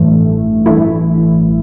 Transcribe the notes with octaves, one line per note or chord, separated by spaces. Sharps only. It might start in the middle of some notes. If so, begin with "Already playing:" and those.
Already playing: A1 G2 E3 A3
A1 G2 E3 A3 E4